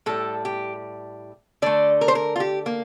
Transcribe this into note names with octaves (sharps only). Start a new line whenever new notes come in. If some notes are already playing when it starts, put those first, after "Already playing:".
A2 G3 A4
G4
D3 A3 D5
A#4
C5
A#4
F4
G4
A#3